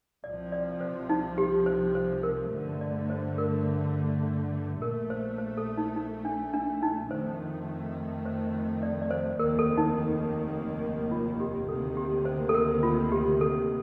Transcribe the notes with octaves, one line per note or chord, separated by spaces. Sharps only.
C2 C3 F3 D5
D5
C5
D#4
G4
C5
C5
A#4
G2 D3 A3
D5
C5
A#4
A#1 A#2 A3 A#4
C5
C5
A4
D#4
D#4
D4
D4
D#4
F2 D#3 A3 C5
C5
C5
D5
D5
C5
F1 D#2 D#3 A#3 A#4
A4
D#4
F4
G4
D2 C3 D#3 A#3 A4
G4
C5
A4
A#4
F4
G4
A4